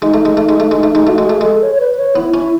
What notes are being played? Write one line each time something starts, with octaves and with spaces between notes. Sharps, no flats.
G#3 D#4
A3
G#3
A3
G#3
A3
G#3 D#4
A3
G#3 D#4
A3 F#4
G#3
A3 G#4
G#3 A4
C#5
C#5
B4
C#5
B3 E4
C#4 E4